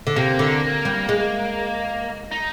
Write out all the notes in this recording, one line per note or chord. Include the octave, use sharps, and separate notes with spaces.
D3
C3 A#3
D3
G3
G#3
D#4